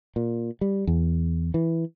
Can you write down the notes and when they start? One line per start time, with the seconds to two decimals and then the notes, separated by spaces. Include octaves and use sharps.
0.16 A#2
0.61 G3
0.87 E2
1.54 E3